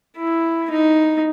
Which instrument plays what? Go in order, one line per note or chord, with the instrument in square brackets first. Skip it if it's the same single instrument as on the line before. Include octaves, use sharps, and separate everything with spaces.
[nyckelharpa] E4
D#4